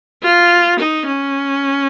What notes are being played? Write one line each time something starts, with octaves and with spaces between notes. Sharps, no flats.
F4
D#4
C#4